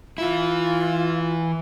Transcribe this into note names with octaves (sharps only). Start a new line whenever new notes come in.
E3 E4 F4